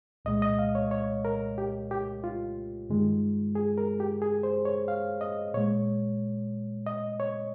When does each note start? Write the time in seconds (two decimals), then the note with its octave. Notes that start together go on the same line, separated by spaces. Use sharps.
0.25 C2 A#2 G#3 D#5
0.42 D#5
0.59 F5
0.75 C#5
0.91 C#5
1.25 A#4
1.58 G4
1.91 G4
2.24 F4
2.90 G2 D#3 G#3
3.55 G#4
3.78 A#4
4.00 G4
4.22 G#4
4.43 C5
4.65 C#5
4.88 F5
5.21 D#5
5.54 A#2 G#3 C#5
6.86 D#5
7.20 C#5